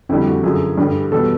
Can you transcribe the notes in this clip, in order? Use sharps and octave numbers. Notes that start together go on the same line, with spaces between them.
F2 D3 G3 E4
F#4
F#2 D3 F3 G#4
G2 D3 G3
E2 B2 G3 A4